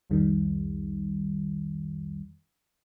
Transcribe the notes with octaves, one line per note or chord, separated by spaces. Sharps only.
C2 F2 D#3 G3